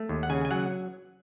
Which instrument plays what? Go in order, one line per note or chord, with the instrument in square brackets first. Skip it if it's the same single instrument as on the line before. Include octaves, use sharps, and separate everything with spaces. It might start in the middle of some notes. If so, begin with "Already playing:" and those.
Already playing: [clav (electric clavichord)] A3
D#2
F#5
C#3 G#5
G#5
F#3 F#5